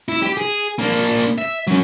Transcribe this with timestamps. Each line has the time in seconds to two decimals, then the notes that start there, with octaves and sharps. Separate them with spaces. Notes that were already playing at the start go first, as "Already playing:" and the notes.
0.09 E4
0.22 G4
0.37 G#4
0.79 A#3 D4
1.38 E5
1.67 F#3 C#4